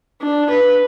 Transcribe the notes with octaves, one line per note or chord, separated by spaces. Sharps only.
D4
B4